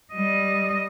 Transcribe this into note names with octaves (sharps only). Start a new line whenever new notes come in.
G3 D#5